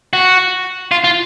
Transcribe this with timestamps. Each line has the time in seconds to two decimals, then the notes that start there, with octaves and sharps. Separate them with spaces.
0.13 F#4
0.91 F4
1.04 F4